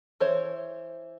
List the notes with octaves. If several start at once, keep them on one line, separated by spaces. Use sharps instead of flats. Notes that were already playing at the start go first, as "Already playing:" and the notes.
E3 C5 C#5